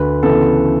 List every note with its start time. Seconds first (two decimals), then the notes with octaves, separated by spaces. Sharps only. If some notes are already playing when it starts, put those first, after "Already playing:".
Already playing: D2 B4
0.23 C#3 E3 B3 A4